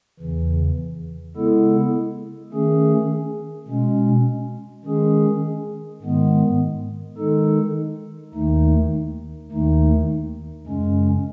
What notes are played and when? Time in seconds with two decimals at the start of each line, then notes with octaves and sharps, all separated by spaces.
0.20 E2 C#3 E3
1.36 C#3 G#3 B3 E4 A4
2.53 D#3 A3 C#4 G#4
3.68 B2 G#3 C#4
4.85 D#3 G#3 C#4 G#4
6.02 G#2 D#3 G#3 B3
7.18 D#3 G#3 D#4 A4
8.34 D#2 D#3 A3 D#4
9.51 D#2 D#3 A3 D#4
10.67 F#2 C#3 G#3 C#4